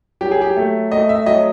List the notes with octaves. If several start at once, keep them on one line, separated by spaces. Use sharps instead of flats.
F#3 G4
G#4
G4
A3
A3 D#5
E5
F#3 D#5